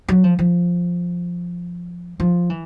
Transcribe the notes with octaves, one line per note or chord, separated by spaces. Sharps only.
F#3
F3
F3
F3
E3